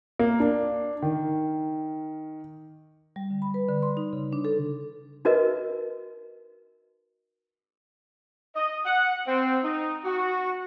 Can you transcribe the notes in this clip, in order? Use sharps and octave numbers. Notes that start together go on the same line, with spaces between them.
A#3
D4
D#3
G3
D3
B5
B4
D3
C6
D#4
C#3
D4
A4
D#4 F#4 A#4 B4 D#5
D#5
F#5
C4
D#4
F#4